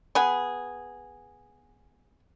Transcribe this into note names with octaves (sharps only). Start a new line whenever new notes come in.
B3 G#4